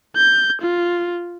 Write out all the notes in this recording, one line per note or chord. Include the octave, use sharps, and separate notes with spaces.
G6
F4